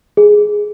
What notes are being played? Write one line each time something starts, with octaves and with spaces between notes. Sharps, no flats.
G#4